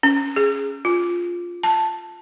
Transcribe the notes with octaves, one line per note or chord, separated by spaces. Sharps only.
C#4
G#4
F4
A5